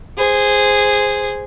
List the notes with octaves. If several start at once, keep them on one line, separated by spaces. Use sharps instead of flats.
G#4 C5